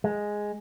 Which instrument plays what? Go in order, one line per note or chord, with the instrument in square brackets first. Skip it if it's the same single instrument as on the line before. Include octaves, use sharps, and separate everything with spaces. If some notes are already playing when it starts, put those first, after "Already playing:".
[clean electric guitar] G#3